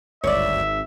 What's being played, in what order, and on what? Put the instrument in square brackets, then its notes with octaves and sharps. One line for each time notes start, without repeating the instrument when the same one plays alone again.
[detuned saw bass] G#1 [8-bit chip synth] D2 G2 [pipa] C#5 D5 [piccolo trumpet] E5